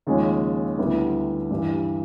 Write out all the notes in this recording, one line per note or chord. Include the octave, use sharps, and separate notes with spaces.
D#2 C#3 F3 G#3 C#4
D2 D3 G3 B3 E4
G2 E3 G3